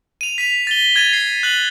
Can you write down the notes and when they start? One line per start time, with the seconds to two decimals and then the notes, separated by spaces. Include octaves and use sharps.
0.21 D#7 F7
0.38 B6 D#7 F7
0.67 A6 G7
0.96 G#6 A6 D#7 F7
1.13 C7
1.43 F#6 F#7